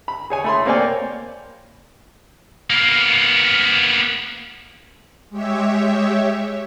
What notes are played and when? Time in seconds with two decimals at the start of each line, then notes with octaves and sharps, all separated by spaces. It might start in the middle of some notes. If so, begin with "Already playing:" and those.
0.08 B5
0.30 G#4 C#5 G#5
0.44 A3 B5 C6
0.66 A#3 C4 C#5 D5 G5 G#5
2.70 A#3 B3
5.30 G#3 G4 C#5 E5